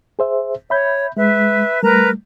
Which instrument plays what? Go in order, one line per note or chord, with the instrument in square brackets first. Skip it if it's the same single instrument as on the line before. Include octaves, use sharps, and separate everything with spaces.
[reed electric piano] G#4 C5 E5
[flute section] C#5 [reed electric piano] E5 B5 G6
[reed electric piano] G#3 [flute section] B4 E5
[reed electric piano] G3 A3 [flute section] A#4 B4 A#5